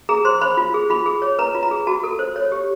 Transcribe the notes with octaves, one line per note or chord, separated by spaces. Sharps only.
G#4 A#5
C5 C6
C5 B5
F4
G#4
F4 B5
G#4
C#5
B4 A#5
F4
A#5
G#4
F#4 A5
A4
C5
C#5
G4